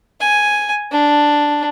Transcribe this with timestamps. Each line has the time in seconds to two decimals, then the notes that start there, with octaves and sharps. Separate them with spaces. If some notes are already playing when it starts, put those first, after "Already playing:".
0.20 G#5
0.92 D4